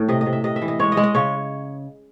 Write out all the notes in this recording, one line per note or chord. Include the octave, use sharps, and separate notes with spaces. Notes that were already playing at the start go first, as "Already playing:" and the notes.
Already playing: A2
C3 D#5
D#5
C3
E5
C3 D#5
E5
E3
D#5
G#3 C#5
D#5
G#3
D#5
C#3 C#5